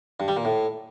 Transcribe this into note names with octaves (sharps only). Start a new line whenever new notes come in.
G2
G3
A#2
A2